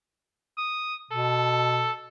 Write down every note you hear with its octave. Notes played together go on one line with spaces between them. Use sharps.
D#6
B2 A4